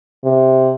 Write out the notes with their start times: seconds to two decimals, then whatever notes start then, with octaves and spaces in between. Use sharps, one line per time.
0.24 C3